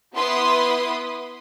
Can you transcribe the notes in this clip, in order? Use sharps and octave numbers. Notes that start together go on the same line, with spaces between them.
B3 E4 B4 C6 D#6